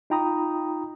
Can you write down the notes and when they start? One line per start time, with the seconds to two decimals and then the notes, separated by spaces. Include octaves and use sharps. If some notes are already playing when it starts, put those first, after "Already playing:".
0.10 D#4 F4 G5 A#5 B5 D#6